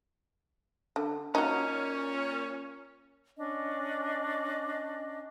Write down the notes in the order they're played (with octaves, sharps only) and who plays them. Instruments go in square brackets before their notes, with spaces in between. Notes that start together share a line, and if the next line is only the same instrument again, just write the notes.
[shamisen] D3
[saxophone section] A#2 C#4 [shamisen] D#4 F#4
[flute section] C#4 D4 D#5